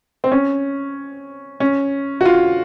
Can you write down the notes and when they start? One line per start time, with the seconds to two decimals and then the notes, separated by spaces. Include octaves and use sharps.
0.24 C4
0.32 C#4
1.60 C#4
2.21 F#4
2.25 F4